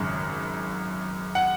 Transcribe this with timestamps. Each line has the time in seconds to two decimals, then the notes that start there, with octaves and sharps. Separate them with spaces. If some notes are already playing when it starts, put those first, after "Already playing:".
Already playing: G#1 F#2 C#3
1.35 F#5